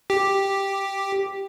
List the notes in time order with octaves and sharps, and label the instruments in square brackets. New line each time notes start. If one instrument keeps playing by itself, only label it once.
[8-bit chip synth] G4